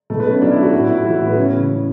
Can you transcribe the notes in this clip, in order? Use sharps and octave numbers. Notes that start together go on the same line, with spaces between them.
B2 A3
B3
F#3
C#4
F#3 D4
E4
F#3
F#4
A2 F#4
E4
A2
E4
E3 F#4
E4
A2 B3
E3 C#4
C#3
C#3